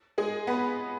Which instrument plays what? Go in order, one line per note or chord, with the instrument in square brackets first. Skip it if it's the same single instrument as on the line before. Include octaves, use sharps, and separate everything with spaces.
[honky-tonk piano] G#3 G#4
B3 B4